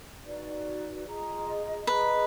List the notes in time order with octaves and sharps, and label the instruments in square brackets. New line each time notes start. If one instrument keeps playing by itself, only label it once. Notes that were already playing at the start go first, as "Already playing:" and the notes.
[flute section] D#4 F#4 B4 D5
F4 G#4 D#5 A#5
[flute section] F4 G#4 D#5 A#5 [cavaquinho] B4